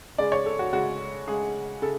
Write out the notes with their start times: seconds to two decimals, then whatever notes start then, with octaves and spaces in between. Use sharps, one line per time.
0.18 C#3 G#3 D5
0.32 C#5
0.46 A4
0.59 F#4
0.73 C#3 G#3 F#4
1.27 C#3 G#3 G#4
1.82 C#3 A4